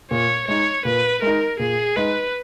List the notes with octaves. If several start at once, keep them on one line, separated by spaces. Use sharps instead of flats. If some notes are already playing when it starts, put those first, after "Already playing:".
A#2 C#5
G#3 D#4 C#5
A#2 B4
G#3 D#4 A#4
A#2 G#4
G#3 D#4 B4